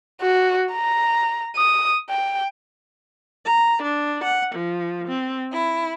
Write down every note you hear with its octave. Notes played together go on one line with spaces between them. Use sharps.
F#4
A#5
D#6
G5
A#5
D4
F#5
F3
C4
E4